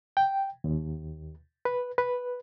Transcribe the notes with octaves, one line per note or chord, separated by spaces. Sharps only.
G5
D#2
B4
B4